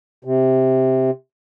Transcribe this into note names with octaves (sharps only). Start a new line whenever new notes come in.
C3